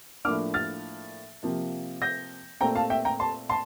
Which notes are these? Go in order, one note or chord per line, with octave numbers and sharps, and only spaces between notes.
A2 F3 A#3 D4 D6 F6
F6 A6
C3 F3 A#3
G6 A#6
A#2 A3 C4 G5 A#5
F5 A5
E5 G5
G5 A#5
A5 C6
A5 C6